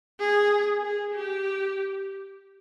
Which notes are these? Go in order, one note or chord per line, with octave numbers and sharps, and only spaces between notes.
G#4
G#4
G4